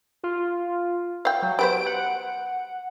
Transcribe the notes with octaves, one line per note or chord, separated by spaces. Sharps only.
F4
F5 G5
F#3
G3 B3 C5 D7
F#5